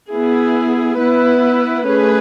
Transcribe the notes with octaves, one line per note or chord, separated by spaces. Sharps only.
B3 E4 G#4
B3 E4 B4
A3 C#4 G#4 B4